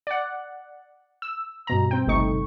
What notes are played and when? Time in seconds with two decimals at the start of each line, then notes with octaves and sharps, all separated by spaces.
0.07 D5 F#5
1.22 E6
1.67 G2 B2 A#5
1.91 C4 G5
2.07 G1 C2 A3 D#4 C#6